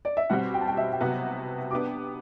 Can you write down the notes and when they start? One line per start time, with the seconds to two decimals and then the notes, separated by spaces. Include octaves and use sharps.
0.05 D5
0.17 E5
0.30 B2 G3 C4 F#4 F#5
0.54 G5
0.61 A5
0.68 G5
0.77 E5
0.92 G5
1.01 C3 F#3 B3 F#4 F#5
1.71 B3 D4 G4 D6